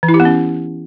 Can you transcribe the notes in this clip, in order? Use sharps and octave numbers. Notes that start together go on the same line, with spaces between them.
E3
E4
G4
B3
C#4